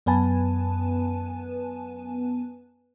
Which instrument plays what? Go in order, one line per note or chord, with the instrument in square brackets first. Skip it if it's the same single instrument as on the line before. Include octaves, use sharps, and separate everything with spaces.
[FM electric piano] F#2 B3 B4 G#5 A5